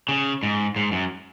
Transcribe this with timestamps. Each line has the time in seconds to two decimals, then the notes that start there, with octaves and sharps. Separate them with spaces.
0.09 C#3
0.43 G#2
0.76 G#2
0.92 F#2